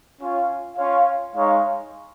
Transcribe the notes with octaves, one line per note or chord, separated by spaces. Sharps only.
C#4 F4 C#5
C#4 F4 C#5 F5
G#3 D#4 C#5 F5